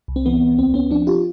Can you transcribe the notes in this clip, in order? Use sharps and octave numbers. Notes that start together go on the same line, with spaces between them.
C2
C4
E3 B3
C2
D2 C4
D2 B3 C#4
F3 C4 D4
F4 G4